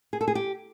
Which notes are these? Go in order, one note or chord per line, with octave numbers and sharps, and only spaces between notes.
G#4
A4
G#4
G4